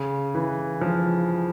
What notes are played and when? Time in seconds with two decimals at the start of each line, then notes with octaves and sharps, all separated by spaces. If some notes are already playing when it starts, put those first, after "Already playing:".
Already playing: C#3
0.35 E3
0.81 F3